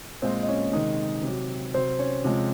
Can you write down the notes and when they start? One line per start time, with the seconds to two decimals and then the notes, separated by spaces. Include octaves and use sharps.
0.22 A#2 G#3 C4 C5
0.43 D#5
0.48 C#4 C#5
0.73 C3 D#3 G#3 D#4 D#5
1.23 C3 F#3
1.74 C3 F#3 C4 C5
1.99 C#4 C#5
2.24 C3 F3 G#3